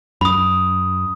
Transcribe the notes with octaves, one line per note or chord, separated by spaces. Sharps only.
F#2 B5 D#6